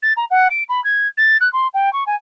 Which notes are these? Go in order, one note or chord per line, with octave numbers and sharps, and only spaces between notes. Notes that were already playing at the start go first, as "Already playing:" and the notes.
A6
A#5
F#5
D7
B5
G#6
A6
F#6
C6
G5
C#6
G#5